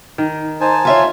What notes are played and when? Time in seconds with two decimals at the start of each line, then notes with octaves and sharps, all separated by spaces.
0.18 D#3
0.61 D#4 C5 G#5 A5
0.85 F4 C#5 E5 F5